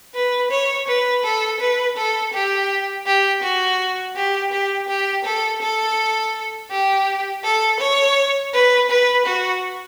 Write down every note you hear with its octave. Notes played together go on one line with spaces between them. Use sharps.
B4
C#5
B4
A4
B4
A4
G4
G4
F#4
G4
G4
G4
A4
A4
G4
A4
C#5
B4
B4
F#4